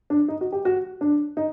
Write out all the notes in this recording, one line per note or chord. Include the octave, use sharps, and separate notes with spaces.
D4
D#4
F#4
G4
F#4
D4
D#4